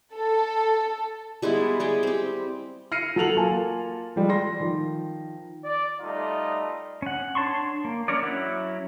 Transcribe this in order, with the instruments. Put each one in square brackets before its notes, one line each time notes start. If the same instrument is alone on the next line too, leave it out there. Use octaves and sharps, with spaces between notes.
[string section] A4
[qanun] G3 G#3 B3 E4
G3 G#3 G#4 G5
C4 G4
[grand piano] F6 A#6 C7 C#7 D#7
F#3 A4 F#5 F7 F#7
A#3 F4 G#5 A5
F3 G3 G#3
C6 A#6
D#3 F3
[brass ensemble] D5
G3 A3 D#4 F4 D#5
[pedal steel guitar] C#4 F#5
D4 C#5 A5 C6 C#6
A#3
C#4 D4 A#4 C#5 D5
F#3 C#4 E4 F#5 F#6